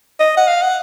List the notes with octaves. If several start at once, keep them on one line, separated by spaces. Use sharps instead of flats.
D#5
F#5
F5
F#5